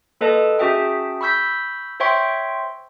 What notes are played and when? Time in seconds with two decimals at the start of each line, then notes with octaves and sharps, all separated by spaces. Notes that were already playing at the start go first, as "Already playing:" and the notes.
0.21 A#3 A4 B4 D#5 A5
0.59 C#4 F#4 G#4 E5 G5 A5
1.21 B5 C#6 E6 G6 B6
2.00 C5 C#5 E5 G5 C6 C#6